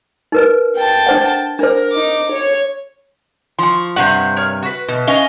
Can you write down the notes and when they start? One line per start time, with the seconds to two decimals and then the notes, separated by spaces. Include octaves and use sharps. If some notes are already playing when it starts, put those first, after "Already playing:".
0.32 D#4 A#4 B4
0.76 G5 A5
1.06 D4 C5 F#5
1.59 D4 A#4 C5
1.92 D#4 D6
2.32 C#5
3.59 F3 C6 C#6
3.96 G2 C3 C5 F#5
4.37 A#4 C#5 F6
4.63 F#4 B4
4.88 B2
5.07 C#4 D#5 F5